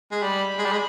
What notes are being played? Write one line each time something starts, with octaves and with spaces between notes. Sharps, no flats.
G#3
G3 B5
G#3
G3
G#3